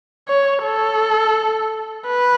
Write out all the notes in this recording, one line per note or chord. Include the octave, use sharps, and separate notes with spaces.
C#5
A4
B4